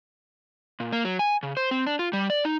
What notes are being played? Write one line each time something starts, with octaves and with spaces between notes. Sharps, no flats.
A#2
A#3
F#3
G#5
C#3
C5
C4
D4
F4
G3
D5
D#4